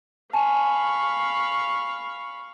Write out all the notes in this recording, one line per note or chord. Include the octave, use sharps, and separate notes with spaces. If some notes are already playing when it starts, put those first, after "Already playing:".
F5 G#5 A5 B5 C#6